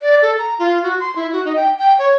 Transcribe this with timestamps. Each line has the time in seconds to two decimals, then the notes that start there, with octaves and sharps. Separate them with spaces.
0.02 D5
0.22 A4
0.39 A#5
0.59 F4
0.83 F#4
1.00 C6
1.16 E4
1.33 F#4
1.45 D#4
1.56 G5
1.78 G5
1.99 C#5